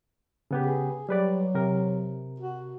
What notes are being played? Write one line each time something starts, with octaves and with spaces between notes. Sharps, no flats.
C#3 B3 G4
G#4
F#3 G3 B4 D5
C3 A#4
F#4